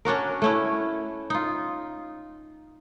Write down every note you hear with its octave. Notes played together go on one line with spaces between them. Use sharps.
C#4 D4 F#4 A#4
A3 C#4 E4
D#4 F4